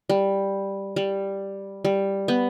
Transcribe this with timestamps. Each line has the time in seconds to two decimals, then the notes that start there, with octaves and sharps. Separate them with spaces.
0.09 G3
0.96 G3
1.85 G3
2.28 B3